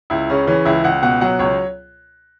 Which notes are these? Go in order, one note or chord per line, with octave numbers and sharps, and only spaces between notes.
C#2 E4
C#3 C#4
E3 C#4
C#2 E4
C#2 F#5
B2 F#5
F#3 F#5
C#2 C#5